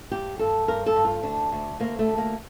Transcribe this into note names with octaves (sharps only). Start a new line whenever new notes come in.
G2 G4
G2 A4
G2 A#4
A4
G2
F4
D2 D4
D2
D2 A#3
A3
D2
A#3